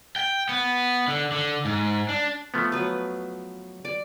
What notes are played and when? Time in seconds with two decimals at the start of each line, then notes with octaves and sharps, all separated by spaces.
0.16 G5
0.49 B3
1.08 D3
1.32 D3
1.65 G#2
2.09 D4
2.54 F3 A3 B3
2.72 F#3 B4
3.85 D5